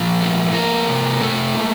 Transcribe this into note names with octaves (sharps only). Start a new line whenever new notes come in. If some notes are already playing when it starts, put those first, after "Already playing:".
Already playing: A#2 F3
A3
F3 A#3 A#4
C3
C3 A3 A4
A#3